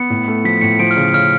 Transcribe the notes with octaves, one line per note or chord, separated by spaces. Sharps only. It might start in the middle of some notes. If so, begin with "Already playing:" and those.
Already playing: B3 C#7
A2
A3
F3 B6
A2 C#7
F3 D7
F6
C#3
F6
C#3 F6